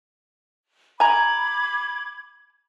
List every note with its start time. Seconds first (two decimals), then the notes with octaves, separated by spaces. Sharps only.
1.00 G#5 A#5 B5 D6 G#6